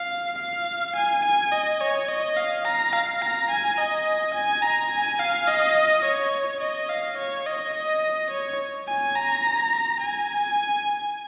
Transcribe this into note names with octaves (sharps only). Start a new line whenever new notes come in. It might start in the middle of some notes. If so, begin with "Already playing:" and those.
Already playing: F5
F5
G#5
G#5
D#5
C#5
D#5
F5
A#5
F5
A#5
G#5
D#5
G#5
A#5
G#5
F5
D#5
C#5
D#5
F5
C#5
D#5
D#5
C#5
G#5
A#5
G#5